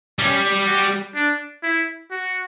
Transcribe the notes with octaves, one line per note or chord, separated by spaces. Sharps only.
G3 C#4
F#4
D4
E4
F#4